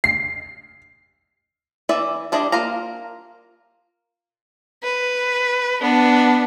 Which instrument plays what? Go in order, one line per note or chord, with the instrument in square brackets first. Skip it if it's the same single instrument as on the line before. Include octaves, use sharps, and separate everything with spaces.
[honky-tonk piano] C7
[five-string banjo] E3 E4 B4 D5 E5
G3 D4 E4 D5 D#5
A#3 F4 F5 A#5
[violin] B4
B3 D4